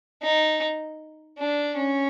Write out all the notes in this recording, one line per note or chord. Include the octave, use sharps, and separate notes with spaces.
D#4
D4
C#4